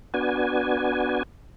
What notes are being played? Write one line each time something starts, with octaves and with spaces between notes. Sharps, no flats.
B3 D4 F#4 G#5